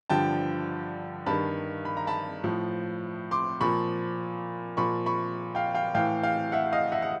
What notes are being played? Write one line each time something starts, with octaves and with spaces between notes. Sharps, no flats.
G2 D3 F3 G5 A5
G2 D#3 A5 B5
B5
A#5
A5 B5
A2 F3
C6 D6
A#2 F3 B5 C#6
A#2 F3 B5 C#6
B5 C#6
F5 G5
F5 G5
A2 E3 F5 G5
F5 G5
E5 F#5
D#5 F5
E5 F#5
F#5